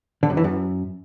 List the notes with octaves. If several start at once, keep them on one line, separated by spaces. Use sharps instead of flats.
D3
F#2
E3
F#2